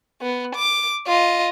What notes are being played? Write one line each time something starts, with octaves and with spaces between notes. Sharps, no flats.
B3
D6
F4 D#5